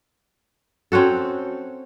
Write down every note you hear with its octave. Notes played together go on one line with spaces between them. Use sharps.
C4 C#4 F#4 A4